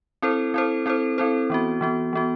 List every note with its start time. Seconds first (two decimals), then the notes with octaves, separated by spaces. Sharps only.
0.22 C4 E4 A4 C5
0.54 C4 E4 A4 C5
0.86 C4 E4 A4 C5
1.18 C4 E4 A4 C5
1.50 E3 B3 F#4
1.81 E3 B3 F#4
2.13 E3 B3 F#4